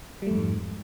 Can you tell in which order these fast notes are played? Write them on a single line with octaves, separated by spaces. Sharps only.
G3 A3 F2 G#2